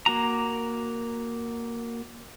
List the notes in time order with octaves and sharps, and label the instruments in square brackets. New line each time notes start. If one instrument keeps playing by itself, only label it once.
[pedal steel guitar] A#3 F#4 A#5